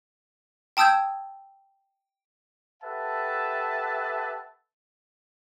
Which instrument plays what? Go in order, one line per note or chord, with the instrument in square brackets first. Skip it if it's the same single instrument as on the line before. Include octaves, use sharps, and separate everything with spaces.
[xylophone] G5 A5 D#6 E6 G6 G#6
[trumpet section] G4 A4 B4 E5 F#5 A5